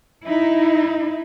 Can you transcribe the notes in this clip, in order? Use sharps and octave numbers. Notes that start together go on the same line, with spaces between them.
D#4 E4